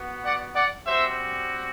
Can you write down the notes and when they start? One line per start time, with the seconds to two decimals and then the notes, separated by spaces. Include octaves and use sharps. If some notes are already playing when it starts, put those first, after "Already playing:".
Already playing: B3 F#4
0.23 D5 F#5
0.55 D5 F#5
0.85 G3 C4 F#4 C5 E5